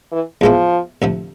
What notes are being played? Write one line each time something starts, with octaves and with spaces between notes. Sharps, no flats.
E3
E2 B2 F3 G#3 B3 E4
D2 C3 F3